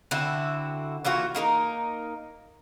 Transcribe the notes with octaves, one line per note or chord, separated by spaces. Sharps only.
D3 C4 E4 F#4
E3 A#3 F4 F#4
A#3 D#4 A4 A#4